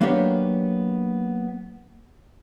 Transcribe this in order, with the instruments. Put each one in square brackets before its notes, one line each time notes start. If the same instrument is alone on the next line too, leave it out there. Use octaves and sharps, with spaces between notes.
[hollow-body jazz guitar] F#3 A#3 B3 D4 G4 C#5